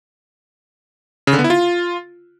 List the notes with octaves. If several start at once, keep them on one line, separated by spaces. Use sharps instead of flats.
C#3
D3
B3
E4
F4